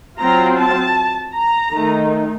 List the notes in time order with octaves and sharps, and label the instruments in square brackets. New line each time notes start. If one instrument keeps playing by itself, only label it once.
[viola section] F#3 C4 F4 A#5
A5
A#5
D#3 A3 D#4